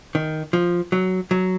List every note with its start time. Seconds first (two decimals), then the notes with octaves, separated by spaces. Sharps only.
0.15 D#3
0.53 F3
0.92 F#3
1.31 F#3